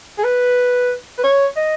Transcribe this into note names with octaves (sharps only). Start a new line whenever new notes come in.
G#4
B4
B4
C#5
D#5